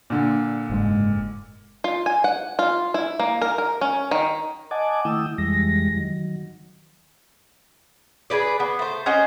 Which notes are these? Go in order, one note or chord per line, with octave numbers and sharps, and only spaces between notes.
A#2 D3
F#1 G#2 G#3
F4
G#5
F#5
F4
E4
A#3
A#4
A#4
C#4
D#3
D#5 F#5 G#5 A5 D6
D#3 A3 E4 G5 D#6 E6
F2 E3 G3 G#3 A#6
D#3 F#3
G#4 A4 B4 D5
B3
A3 C5
C#4 F#4 C5 D#5